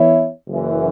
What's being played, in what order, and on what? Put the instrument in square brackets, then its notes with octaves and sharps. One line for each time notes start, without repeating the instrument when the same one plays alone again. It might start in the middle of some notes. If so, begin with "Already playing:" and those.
Already playing: [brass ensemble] E3 B3 E4 C#5 E5
F#1 F#2 E3